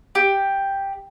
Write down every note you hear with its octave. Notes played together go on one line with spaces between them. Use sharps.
G4